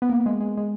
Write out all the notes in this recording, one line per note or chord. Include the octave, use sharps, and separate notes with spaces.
B3
A#3
G#3
G#3
G#3